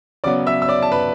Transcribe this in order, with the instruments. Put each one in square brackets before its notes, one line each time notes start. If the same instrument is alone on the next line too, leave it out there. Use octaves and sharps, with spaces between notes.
[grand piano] C#3 F#3 B3 D5 D6
E5 E6
E6
D5 D6
A5
B4 B5